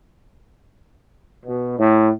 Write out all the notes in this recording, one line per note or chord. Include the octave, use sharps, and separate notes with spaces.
B2
A2